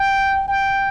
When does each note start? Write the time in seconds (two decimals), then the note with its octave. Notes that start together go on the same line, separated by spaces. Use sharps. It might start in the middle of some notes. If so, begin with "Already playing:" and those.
Already playing: G5
0.48 G5